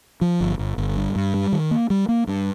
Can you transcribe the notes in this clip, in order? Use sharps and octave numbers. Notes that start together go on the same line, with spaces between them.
F3
G1
G1
G1
G2
G2
G3
D#3
A#3
G3
A#3
G2